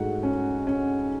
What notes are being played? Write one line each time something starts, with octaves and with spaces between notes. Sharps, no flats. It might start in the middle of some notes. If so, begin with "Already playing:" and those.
Already playing: G#2 A3 F#4 F#5
C#4
C#4